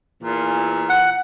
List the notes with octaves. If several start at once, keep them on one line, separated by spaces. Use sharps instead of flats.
E2 A#2
F#5